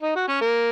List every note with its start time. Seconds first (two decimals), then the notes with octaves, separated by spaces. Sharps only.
0.02 D#4
0.15 F#4
0.28 C#4
0.41 A#3